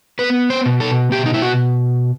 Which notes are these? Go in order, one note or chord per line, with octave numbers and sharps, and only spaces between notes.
B3 B4
C5
B2
A4
B2 G4
D#4
E4
F#4